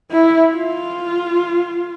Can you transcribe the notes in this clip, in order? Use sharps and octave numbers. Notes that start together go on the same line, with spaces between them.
E4
F4